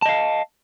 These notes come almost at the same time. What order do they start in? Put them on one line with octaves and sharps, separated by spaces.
A5 D#5 F5